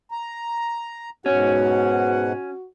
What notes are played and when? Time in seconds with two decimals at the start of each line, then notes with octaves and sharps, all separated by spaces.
0.12 A#5
1.26 G#2 B2 C#4 F#4 F#5